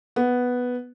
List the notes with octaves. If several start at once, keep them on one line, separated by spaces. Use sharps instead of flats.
B3